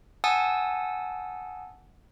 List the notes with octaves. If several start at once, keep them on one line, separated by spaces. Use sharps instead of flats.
F#5 G#5 A5 D#6 E6 A6